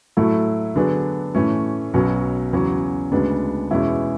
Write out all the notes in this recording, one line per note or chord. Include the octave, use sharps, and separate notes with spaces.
A2 F#3 A3 E4 A4
D3 F#3 B3 D4 G#4
A2 E3 A3 C#4
B1 B2 F#3 C#4
E2 C#3 F#3 C#4
D2 C#3 G#3 B3 D4
E2 B2 G#3 C#4 E4